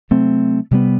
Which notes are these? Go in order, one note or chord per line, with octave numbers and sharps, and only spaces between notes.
C3 F#3 A3 C4
C3 G3 B3